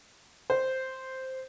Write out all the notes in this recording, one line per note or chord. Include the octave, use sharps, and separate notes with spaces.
C5